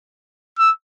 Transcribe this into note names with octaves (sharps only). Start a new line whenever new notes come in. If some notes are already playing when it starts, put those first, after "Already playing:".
E6